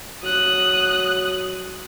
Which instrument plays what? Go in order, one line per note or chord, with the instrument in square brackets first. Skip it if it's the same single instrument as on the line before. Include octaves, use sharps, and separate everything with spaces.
[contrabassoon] F#3 [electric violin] D#6 F#6